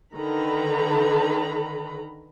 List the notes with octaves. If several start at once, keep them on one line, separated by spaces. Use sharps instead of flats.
D3 D#3 A4 B4 A#5 B5